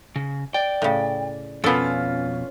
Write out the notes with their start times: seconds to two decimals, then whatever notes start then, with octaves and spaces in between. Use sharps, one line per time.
0.16 C#3
0.54 D5 G5
0.82 A2 C#3
1.64 F2 B2 B3 C#4 F4 A4